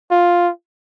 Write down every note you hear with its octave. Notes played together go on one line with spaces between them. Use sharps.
F4